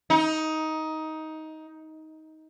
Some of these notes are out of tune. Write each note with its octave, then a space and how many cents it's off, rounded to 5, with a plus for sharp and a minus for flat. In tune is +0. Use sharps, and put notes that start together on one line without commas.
D#4 +15